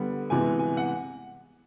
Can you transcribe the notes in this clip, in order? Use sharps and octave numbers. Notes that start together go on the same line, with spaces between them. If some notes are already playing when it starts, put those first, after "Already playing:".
Already playing: D3 G3 B3
C3 E3 G#3 B3 G#5
G#5
F#5